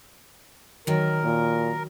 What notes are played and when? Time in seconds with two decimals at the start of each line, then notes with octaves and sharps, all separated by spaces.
0.87 D#3 F#3 A#4
1.24 A#2